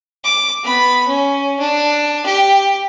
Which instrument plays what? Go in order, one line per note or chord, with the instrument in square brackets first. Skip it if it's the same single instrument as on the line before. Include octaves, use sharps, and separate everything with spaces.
[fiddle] D6
B3 B5
C#4
D4
G4